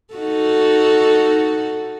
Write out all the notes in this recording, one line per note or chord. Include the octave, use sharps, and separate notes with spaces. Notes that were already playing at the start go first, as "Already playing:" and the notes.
D#4 F#4 A4